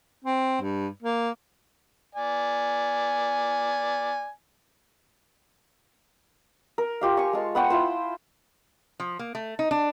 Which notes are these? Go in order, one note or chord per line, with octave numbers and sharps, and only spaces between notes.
C4
G2
A#3
D5 G#5
A#4
F4 G4 F5
G#5 C#6
G#3 A5
B3 F#5 G5 C#6
E4 F4 C5
F3
A#3
A3
D#4
D4